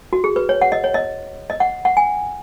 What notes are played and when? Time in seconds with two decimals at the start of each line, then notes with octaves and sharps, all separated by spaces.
0.13 F#4
0.24 G#4
0.36 B4
0.49 C#5
0.61 F#5
0.72 D#5
0.84 C#5
0.94 D#5
1.50 D#5
1.60 F#5
1.85 F#5
1.97 G#5